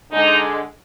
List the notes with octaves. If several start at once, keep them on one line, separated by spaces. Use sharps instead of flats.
D3 G#3 D#4